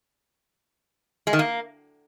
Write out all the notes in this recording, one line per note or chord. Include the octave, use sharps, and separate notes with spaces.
G#3
D#3
A#3